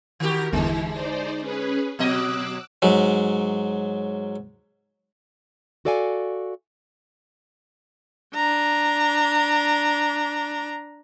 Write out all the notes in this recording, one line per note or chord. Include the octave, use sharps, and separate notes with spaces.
D#3 F#4 G4 A#4
G1 E2 D3 E3 G#3 E4
D#4 C5 D5
C#4 G#4 B4
B2 F#3 D#5 D6 E6 F#6
G#2 F#3
F#4 A4 D5 F5 G#5
D4 A#5